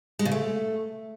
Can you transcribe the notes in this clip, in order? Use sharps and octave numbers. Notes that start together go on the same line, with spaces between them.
G#3
C#3
A3